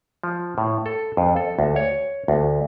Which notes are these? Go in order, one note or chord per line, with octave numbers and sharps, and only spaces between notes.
F3
A2
A4
F2
A4
D2
C#5
D2